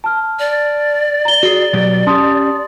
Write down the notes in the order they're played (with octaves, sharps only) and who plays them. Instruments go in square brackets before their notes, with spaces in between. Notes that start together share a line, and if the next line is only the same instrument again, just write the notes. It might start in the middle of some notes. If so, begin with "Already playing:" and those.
[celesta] A5 F6
[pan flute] D5
[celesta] A#5 G7
[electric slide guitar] F#4 G#4
B2 F#3 G4
[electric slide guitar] C#4 G4 [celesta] A5 C6 D#6